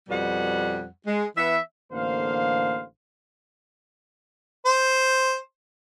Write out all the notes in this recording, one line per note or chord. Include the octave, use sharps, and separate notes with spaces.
F2 B2 G3 F#5
G#3
E3 B3 E5
A1 D3 A#3 C5 F5
C5